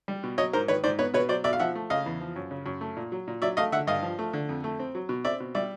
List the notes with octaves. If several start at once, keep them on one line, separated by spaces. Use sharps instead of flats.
G3
B2
F#3 C#5 D#5
G#2 A#4 C5
D#3 B4 C#5
G#2 C5 D5
B3 B4 C#5
B2 B4 C#5
F#3 C5 D5
B2 D5 E5
F5
F3 E5 F#5
A3
C#3 D#5 F5
E2
F3
F#2
C#3
F#2
A3
A#2
F#3
A#2
F#3 D5 E5
A3 D#5 F5
D3 E5 F#5
G2 D#5 F5
F3
A3
D3
F2
A3
C4
F#3
B2
C4 D5 E5
B2
G3 D5 E5